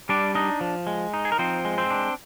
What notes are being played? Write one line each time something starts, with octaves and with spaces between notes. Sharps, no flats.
G3 D4 D5
D4 D#4 D#5
F3
G#3
D#4
G#4
A#4
F3 C4 C5
G#3
C4 C5
D4